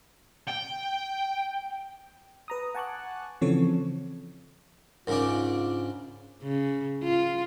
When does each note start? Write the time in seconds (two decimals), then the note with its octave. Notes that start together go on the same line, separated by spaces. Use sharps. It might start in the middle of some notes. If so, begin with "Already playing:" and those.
0.47 G5
2.48 B4 A#5 D#6
2.75 F#5 G#5 A5 C#6 D6 F#6
3.41 C#3 E3 F3 C4 A4 C#5
5.07 G#2 C#3 D4 F4 A#4
6.43 C#3
7.03 F4